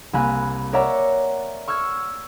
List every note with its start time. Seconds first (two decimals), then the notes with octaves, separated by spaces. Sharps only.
0.13 C2 A#3 G#5 B5 F#6
0.73 A#4 C#5 D5 E5 F#5 A#5
1.68 C#6 E6 F6 G#6